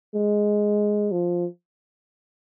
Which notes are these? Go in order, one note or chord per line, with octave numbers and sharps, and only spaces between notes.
G#3
F3